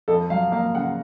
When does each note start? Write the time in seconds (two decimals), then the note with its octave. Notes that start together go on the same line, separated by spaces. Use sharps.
0.08 F2 A4
0.30 F#3 F5
0.52 A#3 F5
0.75 C#3 F#5